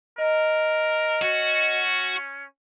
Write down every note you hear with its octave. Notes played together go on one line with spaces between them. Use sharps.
A#4 D#5
C#4 F#4